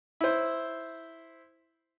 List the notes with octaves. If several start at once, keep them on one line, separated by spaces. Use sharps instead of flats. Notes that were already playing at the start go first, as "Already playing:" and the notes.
E4 C5